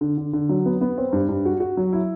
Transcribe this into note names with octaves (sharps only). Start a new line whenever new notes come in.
D3
D3
D3
F#3
B3
B3
C4
G2
G2
F#4
F#4
F#3
E4